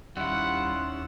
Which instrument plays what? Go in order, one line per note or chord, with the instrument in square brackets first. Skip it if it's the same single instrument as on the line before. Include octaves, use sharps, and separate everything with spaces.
[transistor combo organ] D#2 C#4 E6 [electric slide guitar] G3 E4 [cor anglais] F4 [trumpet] F#5